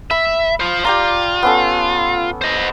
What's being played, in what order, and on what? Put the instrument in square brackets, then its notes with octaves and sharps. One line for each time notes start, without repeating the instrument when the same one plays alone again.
[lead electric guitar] E5 [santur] B5
[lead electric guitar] F4 C5
[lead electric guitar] F4 [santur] G4 D5 A#5
[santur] B3 C#4 A4
[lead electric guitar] C5 D#5